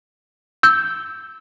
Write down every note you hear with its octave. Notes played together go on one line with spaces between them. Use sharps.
E6 G6